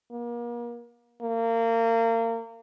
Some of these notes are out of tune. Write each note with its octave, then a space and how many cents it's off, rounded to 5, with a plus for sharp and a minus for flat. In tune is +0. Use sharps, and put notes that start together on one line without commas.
A#3 +35
A#3 -30